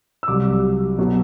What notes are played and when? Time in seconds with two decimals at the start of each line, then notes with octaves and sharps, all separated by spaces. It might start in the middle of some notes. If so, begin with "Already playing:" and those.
0.23 E6
0.28 C2 C3 F#3 D6
0.99 B2 F#3